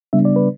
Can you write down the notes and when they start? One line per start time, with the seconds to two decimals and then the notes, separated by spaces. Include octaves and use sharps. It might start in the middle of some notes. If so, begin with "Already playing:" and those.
0.13 C#3 G3 B3 D4 E5
0.25 D5
0.36 B4